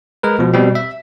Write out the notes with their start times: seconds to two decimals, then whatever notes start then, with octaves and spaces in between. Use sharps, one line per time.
0.23 G#3 A#4 B4
0.39 B2 F3
0.53 B2 G3 C4
0.75 E5